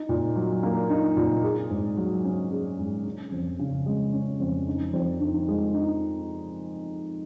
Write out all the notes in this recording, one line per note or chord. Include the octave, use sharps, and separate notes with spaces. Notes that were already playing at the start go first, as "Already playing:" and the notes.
Already playing: D#4
A#2
F#3
A#3
D#4
A#2
G#4
G#2
F#3
C#4
G#4
G#2
C#4
F2
C#3
G#3
C#4
F2
D#4
F2
D#3
G#3
D#4